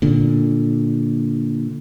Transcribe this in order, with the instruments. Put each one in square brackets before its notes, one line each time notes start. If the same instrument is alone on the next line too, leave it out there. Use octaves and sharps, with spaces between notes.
[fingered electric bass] A#2 D3